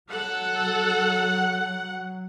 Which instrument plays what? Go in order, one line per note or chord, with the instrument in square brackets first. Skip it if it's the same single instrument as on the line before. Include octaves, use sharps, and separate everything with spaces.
[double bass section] F#3 [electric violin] A4 [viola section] F#5